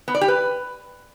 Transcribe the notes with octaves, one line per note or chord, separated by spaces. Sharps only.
B3
D5
G4
B4